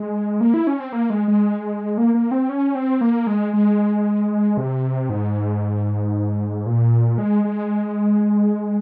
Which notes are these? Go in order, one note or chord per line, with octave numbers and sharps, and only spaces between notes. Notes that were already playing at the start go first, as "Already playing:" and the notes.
Already playing: G#3
A#3
E4
C#4
C4
A#3
G#3
G#3
A#3
A#3
C4
C#4
C4
A#3
G#3
G#3
C3
G#2
A#2
G#3
G#3